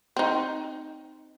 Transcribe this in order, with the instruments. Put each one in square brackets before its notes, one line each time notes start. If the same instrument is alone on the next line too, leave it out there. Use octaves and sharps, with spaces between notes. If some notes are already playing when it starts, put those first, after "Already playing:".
[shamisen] C4 D#4